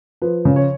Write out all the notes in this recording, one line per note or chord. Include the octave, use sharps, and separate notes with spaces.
F3 B4
C#3
C#5